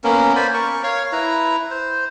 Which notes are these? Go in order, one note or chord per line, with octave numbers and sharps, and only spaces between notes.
A#3 B3 C#4 A#4
C5 D5 G#5 B5
A#4 C#6
C#5 F5
E4 B4 A#5
C5